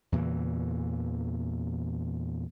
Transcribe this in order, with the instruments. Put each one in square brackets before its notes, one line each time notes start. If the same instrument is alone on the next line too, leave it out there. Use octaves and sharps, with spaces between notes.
[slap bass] E2 A#2 C#3 E3